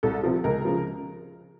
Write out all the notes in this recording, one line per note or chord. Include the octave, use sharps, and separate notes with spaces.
C2 A4
C3 F3
C#2 A#4
C#3 F3